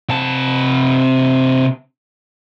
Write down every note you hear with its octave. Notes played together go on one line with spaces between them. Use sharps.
C3 A5